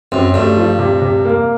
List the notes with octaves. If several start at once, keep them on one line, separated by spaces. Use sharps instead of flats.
F#2 C4
G2 A3
F3
C3
C3
A#3